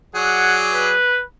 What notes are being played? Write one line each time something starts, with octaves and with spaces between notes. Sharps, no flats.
F#3 G#4 D5 F#5
B4